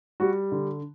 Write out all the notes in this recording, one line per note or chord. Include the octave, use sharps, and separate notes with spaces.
G3 F#4
D3